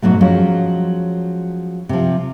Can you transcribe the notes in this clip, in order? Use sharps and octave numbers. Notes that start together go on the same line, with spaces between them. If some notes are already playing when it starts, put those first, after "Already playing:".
G#2 B2 F#3 A3
F3 F#3 G#3 C#4
C3 F3